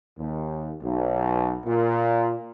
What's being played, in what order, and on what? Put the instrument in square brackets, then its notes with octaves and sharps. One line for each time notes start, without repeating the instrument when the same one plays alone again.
[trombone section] D#2
B1
A#2